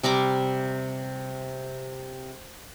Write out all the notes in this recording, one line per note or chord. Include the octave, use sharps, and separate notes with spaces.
C3 G3 A#5 D6